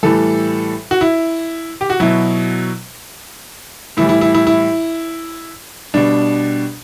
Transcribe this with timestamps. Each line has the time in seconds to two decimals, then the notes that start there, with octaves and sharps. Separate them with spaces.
0.03 A2 E3 G3 A4
0.91 F#4
1.01 E4
1.81 G4
1.90 F#4
2.00 B2 F#3 E4
3.97 A2 E3 G3 E4
4.09 E4
4.21 E4
4.34 E4
4.47 E4
5.94 B2 G3 D4